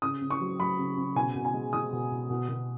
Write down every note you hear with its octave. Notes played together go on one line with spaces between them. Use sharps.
C#3 D#6
C#3
C#6
F#3
F#3 B5
C#3
C#3
B2 G#5
B2
G#5
G#3
G#3 D#6
B2
B2
B2
B2